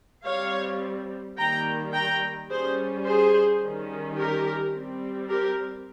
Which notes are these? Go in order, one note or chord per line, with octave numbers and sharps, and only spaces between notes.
G3 C4 C#5 F5
D#3 G3 A#3 G5 A#5
G5 A#5
G3 C#4 G#4 C5
G#4 C5
D#3 G3 C#4
G4 A#4
G3 C4
G4 A#4